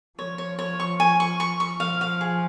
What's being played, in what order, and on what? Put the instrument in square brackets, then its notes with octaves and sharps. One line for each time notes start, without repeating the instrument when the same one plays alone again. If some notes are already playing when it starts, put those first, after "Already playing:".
[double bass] F3 [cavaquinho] C#5
[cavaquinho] C#5
C#5
C#6
G#5
C#6
C#6
C#6
[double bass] F3 [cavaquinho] F5
[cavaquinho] F5
G#4